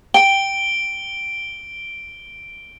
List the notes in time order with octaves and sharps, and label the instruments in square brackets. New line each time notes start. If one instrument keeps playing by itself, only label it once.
[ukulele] G5 [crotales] D7 G7